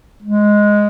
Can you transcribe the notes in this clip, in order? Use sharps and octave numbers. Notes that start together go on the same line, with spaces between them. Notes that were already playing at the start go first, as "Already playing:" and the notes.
G#3